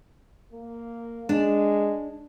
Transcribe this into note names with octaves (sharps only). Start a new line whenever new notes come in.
A#3
G#3 D4